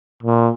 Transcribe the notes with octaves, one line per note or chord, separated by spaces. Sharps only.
A#2